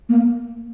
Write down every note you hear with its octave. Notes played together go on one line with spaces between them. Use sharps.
A#3